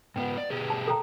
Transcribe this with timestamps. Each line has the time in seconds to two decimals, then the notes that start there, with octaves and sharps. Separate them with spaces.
0.16 G#2 B3 F#5 G5
0.38 D5
0.50 B2 G4 G#4
0.70 A5
0.88 A4 G5 A#5